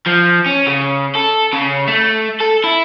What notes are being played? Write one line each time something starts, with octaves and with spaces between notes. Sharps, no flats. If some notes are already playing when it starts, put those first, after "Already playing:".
F3
C#4
C#3
A4
C#3
A3
A4
E4